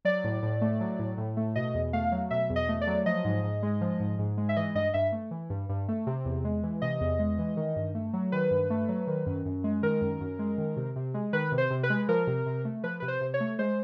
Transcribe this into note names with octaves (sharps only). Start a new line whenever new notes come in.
F#3 D5
A2
A2
A3
F#3
A2
A2
A3
B2 D#5
E2
A3 F5
F#3
B2 E5
E2
D#5
A3
D5
F#3
F3 D#5
G#2
G#2
G#3
F3
G#2
G#2
G#3
E5
E3 D#5
G2 D#5
G2 E5
A3
E3
G2
G2
A3
C3
E2
G#3
E3
C3 D#5
E2
G#3
E3
D#3
G2
A3
F#3
D#3 B4
G2
A3
F#3
D#3
F#2
F#2
G#3
D#3 A#4
F#2
F#2
G#3
D#3
C3
C3
G#3
D#3 B4
C3
C5
C3
B4
G#3
F3 A#4
C3
C3
A3
F3 B4
C3 B4
C5
C3
C#5
A3
G#3 C5